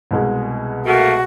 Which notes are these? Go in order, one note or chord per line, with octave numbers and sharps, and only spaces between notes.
C2 B2 G#3
A3 A#3 F#4